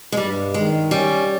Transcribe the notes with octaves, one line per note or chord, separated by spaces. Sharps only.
G#3
G2 G3
D#3 G#3
G3 C#4